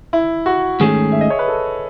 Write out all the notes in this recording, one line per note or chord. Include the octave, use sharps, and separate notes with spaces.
E4
F#4
G#2 D#3 A3 C#4 G#4
E5
D#5
C#5
B4
A4